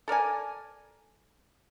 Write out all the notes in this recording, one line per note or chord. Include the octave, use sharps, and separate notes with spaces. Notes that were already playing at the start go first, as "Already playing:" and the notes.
A4 A#4 D5 G#5